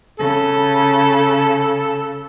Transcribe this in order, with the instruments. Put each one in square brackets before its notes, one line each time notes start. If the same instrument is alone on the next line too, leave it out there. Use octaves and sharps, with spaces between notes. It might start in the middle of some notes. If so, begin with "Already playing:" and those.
[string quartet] C#3 [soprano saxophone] A4